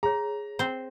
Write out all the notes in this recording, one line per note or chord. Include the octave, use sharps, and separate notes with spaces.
G#4 C#5 A#5
C4 C5